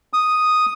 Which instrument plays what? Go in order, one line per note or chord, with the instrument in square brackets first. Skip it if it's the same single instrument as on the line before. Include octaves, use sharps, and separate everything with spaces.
[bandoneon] D#6